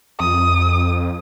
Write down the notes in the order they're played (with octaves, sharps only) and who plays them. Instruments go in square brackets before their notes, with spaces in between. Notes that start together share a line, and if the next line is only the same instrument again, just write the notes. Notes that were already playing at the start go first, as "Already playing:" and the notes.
[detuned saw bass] F2 [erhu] D#6